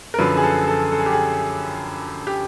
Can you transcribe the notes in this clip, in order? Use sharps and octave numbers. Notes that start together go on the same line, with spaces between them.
A#4
F#2 D3 F3 B4
G#4
A4
A4
A4
G#4
G4
G#4
G4